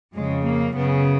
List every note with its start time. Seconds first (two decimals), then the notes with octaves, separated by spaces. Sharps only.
0.13 F2 C#3 G#3
0.44 A#3
0.75 F#2 C#3 B3